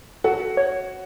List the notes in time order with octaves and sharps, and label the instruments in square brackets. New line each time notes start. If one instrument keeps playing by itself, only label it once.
[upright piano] F#4 F#5 [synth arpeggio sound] A4
[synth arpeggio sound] C#5